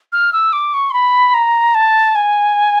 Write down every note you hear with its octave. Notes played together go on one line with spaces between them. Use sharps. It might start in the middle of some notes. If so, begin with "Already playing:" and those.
F6
E6
D6
C#6
C6
B5
A#5
A5
G#5